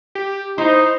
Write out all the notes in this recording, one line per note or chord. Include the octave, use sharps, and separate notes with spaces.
G4
D#4 E4 C5